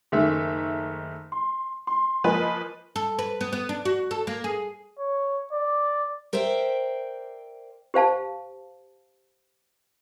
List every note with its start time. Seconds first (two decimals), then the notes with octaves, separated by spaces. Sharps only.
0.12 F#1 D#3 A3 E5
1.32 C6
1.87 C6
2.24 F3 A#3 B4 D#5 G#5
2.96 A4
3.19 B4
3.41 B3
3.53 B3
3.69 D4
3.85 F#4
4.11 A4
4.27 A#3
4.44 G#4
4.99 C#5
5.53 D5
6.33 A#4 C5 D5 E5 G5
7.94 G4 C5 F5 A5